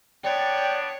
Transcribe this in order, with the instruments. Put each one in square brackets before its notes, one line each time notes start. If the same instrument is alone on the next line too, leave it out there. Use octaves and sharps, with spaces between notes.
[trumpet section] B3 D4 [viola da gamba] C#5 [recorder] D5 [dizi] G5